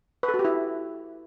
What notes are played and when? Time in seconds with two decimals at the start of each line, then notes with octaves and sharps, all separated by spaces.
0.23 B4
0.29 A4
0.34 F#4
0.39 G4
0.45 E4